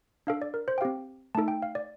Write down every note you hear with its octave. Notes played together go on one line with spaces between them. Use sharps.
D4 A4 F5
D5
A#4
C5
G5
C4 G4 F5
A3 D#4 A4 A5
G5
F5
D5